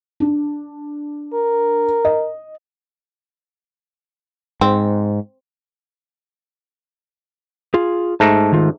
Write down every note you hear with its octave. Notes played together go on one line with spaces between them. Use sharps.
D4
A#4
D#5
G#2 C4
F4 G#4
G#2 A3 A5 A#5
D#3 F4